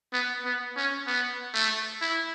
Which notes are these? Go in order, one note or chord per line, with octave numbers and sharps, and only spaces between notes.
B3
B3
C#4
B3
A3
E4